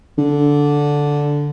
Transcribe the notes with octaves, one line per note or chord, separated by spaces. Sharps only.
D3